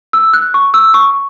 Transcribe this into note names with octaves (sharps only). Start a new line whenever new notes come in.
E6
F#6
C#6
E6
C#6